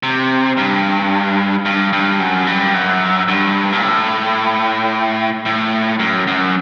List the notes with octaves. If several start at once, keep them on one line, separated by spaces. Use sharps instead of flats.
C3
G2
G2
G2
F#2
G2
F#2
G2
A#2
A2
A2
F#2
F#2